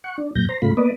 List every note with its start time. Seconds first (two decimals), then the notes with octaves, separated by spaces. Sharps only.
0.04 F#5 C#6
0.18 D4
0.35 F#2 A#2 G6 A#6
0.49 C5 A#5
0.62 G#2 C#3 A3 F4 B5
0.77 A#3 B3 B4 D5 D#5